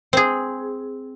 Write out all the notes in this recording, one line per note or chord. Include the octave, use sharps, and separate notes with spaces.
C4 G#4